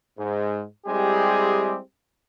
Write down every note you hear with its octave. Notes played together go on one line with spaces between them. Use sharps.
G#2
G3 G#3 C4 E4 G4 G#4